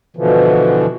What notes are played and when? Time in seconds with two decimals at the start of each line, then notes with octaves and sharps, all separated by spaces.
0.17 B2 D3 E3 F3